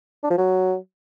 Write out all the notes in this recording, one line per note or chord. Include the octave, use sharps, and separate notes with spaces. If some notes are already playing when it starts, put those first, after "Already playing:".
D4
F3
F#3